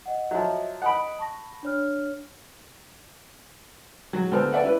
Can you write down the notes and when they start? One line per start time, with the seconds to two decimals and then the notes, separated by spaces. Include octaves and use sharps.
0.06 D#5 F#5
0.31 F3 F#3 D#5 E5
0.82 D#5 F#5 B5 D#6 D7
1.19 A5 C#6 A#6
1.63 D4 C#5 F6
4.13 F#3 G#3
4.31 D2 B3 A4 C5 F6
4.52 B4 D5 E5 F#5
4.64 C#4 E4 B4